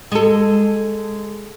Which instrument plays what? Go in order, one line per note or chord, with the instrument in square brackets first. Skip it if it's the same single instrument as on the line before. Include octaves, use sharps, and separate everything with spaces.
[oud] G#3 A4